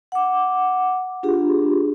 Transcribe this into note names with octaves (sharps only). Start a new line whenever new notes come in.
F#5 D6
D4 F4 G4 G#4